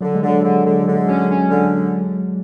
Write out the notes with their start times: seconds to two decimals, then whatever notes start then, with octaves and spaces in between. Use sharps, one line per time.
0.01 D3 F#3
0.15 G#3
0.23 D3
0.28 F#3
0.42 D3 G#3
0.56 F#3
0.65 D3 G#3
0.83 D3 F#3
0.96 G#3
1.08 F#3 C#4
1.22 G#3
1.29 C#4
1.36 F#3
1.50 D3